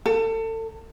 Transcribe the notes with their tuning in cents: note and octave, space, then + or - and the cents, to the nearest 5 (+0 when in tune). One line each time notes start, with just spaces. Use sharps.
A4 +30